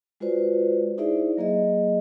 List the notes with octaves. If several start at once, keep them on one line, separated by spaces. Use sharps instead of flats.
G#3 F4 F#4 B4 C5 D5
D#4 E4 G#4 C5 D5 E5
F#3 A#3 G#4 D#5